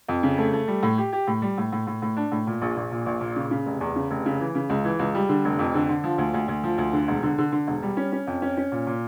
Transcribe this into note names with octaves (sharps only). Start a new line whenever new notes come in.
F2
C#3
A3
A3
G3
A2
G4
G4
A2
G3
A2
A2
A2
A2
D4
A2
A#2
A#1
A#1
A#2
A#1
A#2
C#3
C#3
F1
E2
C#3
F1
C#3
E3
C#3
C#2
E3
C#2
G3
D3
F1
F2
D3
D3
F3
D2
D2
D2
F3
D2
D3
E1
D3
D3
D3
E1
G3
C#4
C#4
F2
C#4
C#4
A#2
A#2